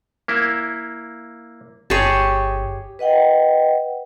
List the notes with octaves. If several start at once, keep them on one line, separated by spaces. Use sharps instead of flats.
A#3 E4
G1 G4 G#4 C#5 A5
B4 D#5 F#5 G5